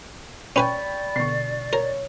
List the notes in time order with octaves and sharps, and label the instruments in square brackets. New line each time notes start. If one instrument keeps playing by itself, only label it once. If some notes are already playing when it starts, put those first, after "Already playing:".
[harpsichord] C#4 B4 G#5 [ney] D5 [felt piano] G5 B5 C#6
[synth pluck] B2 D3 [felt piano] C#6 C7
[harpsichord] A#4 [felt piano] C#5